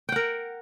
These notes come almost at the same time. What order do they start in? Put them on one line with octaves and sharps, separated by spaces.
G5 F#5 A#4